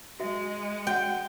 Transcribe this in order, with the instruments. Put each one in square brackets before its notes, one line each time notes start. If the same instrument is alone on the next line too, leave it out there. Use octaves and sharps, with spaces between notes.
[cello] G#3 [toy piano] F#4 E5
[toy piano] F#4 E5 F#5 [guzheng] G5